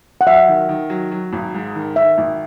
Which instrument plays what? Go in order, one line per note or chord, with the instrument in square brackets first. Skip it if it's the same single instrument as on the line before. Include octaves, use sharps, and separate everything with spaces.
[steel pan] F#5
[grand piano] F#3 [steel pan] E5
[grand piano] D#3
D#3
F#3
F#3
G#1
G#2
D#3
[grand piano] D#3 [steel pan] E5
[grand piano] G#1